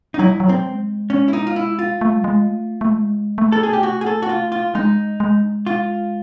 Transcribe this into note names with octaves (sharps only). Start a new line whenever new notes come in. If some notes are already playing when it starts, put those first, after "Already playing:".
D#4
F#3 E4
G3
F#3
C4
G#3
C#4
E4
D#4
F4
E4
F4
A3
G#3
G3
G#3
A3
A3
G#3
A3
A4
G#4
G4
F#4
G#4
A4
F#4
F4
F4
G#3 D#4
G#3
F4